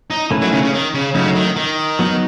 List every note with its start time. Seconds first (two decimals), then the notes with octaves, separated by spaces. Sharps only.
0.10 D#4
0.31 D#3 A3 C#4 E4 B4
0.41 F#3
0.52 C#3
0.63 C#3
0.73 D#3
0.94 C#3
1.14 C#3 F#3 A3 D#4
1.35 D#3
1.56 D#3
1.99 F#3 B3 D#4